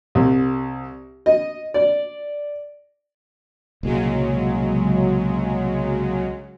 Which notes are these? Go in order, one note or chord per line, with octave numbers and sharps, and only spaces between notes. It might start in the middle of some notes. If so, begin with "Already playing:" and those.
C2
D#5
D5
C2 A#2 C#3 F#3 G#3